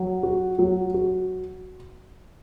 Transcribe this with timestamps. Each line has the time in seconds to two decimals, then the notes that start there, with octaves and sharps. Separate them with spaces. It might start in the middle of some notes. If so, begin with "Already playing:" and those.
Already playing: F#3
0.23 F#4
0.59 F#3
0.94 F#4